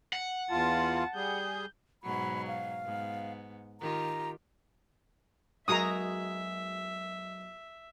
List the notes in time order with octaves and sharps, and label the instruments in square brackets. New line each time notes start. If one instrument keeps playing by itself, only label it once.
[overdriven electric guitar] F#5
[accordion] E2 F4 [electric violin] A5
[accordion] G3 G#4 [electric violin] G6
[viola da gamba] G#2 B2 F#3 [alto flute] B5
[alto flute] F5
[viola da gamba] G#2 B3
[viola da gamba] D#3 F4 G4 [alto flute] A#5
[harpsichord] B1 G#3 [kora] F#4 G#4 A#4 [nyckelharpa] E5 [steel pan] A#5 D#6